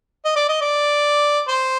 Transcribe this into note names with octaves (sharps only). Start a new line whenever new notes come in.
D#5
D5
D#5
D5
C5